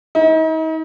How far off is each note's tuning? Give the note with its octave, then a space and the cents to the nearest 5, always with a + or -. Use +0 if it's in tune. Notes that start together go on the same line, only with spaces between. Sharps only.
D#4 +40